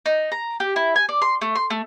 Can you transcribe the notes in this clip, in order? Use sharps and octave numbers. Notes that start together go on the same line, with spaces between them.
D#4
A#5
G4
E4
G#5
D5
C6
A3
C6
A3